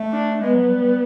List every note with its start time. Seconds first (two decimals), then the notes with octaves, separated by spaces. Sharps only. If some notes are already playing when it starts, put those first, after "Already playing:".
Already playing: A3
0.12 D4
0.41 G#3 B3
0.55 F#3
0.69 G3
0.82 G3